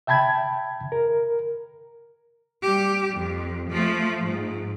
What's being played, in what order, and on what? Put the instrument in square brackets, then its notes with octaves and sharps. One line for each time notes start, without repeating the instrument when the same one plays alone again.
[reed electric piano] E5 G5 A5 B5 G#6
A#4
[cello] G3 G4
F2
F3 A3
G#2